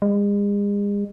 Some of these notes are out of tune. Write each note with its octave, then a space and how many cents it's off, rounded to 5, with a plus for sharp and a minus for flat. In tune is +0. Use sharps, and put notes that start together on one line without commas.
G#3 -40